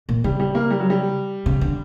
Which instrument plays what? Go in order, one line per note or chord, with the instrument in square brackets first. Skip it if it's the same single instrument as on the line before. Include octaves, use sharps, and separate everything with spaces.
[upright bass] A#2
[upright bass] C#3 [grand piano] G3
[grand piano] G3
A#3
G3
F#3
G3
[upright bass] C#3
D3